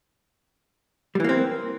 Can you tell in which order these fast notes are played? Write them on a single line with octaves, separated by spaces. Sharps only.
G3 E3 A#3 C4